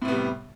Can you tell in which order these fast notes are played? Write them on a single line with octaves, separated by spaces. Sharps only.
A2 C3 B3 G3